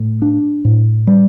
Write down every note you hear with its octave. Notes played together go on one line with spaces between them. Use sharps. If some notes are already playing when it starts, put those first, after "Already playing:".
Already playing: A2
D4
A2
G3